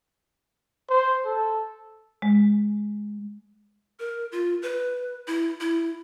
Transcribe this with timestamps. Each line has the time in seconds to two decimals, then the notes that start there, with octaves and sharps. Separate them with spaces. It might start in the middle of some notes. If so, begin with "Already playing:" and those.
0.90 C5
1.26 A4
2.22 G#3
4.00 A#4
4.32 F4
4.62 B4
5.28 E4
5.61 E4